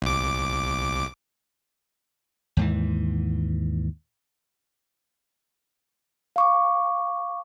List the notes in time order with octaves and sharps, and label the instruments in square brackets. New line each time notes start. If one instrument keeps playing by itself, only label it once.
[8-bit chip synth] C2 D6
[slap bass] D#2 G#2 E3
[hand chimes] F5 C#6 D6